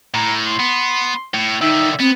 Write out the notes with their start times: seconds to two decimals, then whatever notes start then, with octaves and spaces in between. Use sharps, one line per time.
0.14 A2 A#5
0.46 C6
0.60 B3
1.34 A2
1.62 D3 D#3 D#4 E5
2.00 B3 C4